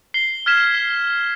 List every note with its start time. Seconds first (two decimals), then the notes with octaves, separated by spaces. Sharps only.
0.14 C7 G7
0.46 F6 G#6 B6 E7
0.75 C7